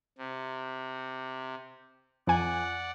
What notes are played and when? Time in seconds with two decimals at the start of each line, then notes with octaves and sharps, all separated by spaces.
0.18 C3
2.27 F2 D5 F#5 G#5